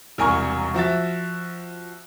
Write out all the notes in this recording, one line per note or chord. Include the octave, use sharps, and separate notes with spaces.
E1 C2 A#4 G#5 C#6
F3 F#4 E5 A6